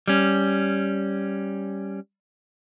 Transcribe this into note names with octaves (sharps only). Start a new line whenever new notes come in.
G3 C#4